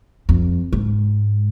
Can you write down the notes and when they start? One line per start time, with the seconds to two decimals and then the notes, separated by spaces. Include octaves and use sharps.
0.29 F2
0.73 G#2